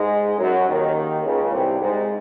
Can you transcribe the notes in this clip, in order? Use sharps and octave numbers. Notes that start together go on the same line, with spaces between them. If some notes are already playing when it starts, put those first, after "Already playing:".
Already playing: G#2 G#3
F#2 F#3
D#2 D#3
C#2 C#3
C2 C3
G#2